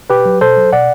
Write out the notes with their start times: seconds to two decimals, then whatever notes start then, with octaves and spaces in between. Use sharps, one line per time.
0.10 B2 G4 B4
0.26 F#3
0.41 B2 A4 C5
0.57 F#3
0.72 B2 D5 F#5